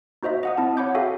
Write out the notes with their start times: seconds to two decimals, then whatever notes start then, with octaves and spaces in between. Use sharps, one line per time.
0.23 D#4 F#4 C5 D#5 E5
0.43 D#5 F#5 D#6
0.57 C4 E4 A5
0.77 C#5 F#5 B5 D6 G6
0.95 F#4 G#4 A4 E5 F5 G5